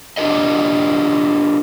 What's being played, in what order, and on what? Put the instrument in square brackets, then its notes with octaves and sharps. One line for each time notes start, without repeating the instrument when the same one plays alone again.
[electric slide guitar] D4 F4 G4 A#4 D#5